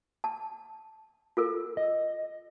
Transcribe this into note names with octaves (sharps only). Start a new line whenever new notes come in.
A5
F4 A4 A#4
D#5